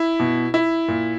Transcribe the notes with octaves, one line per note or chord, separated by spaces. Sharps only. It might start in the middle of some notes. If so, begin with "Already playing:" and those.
Already playing: E4
B2
E4
A#2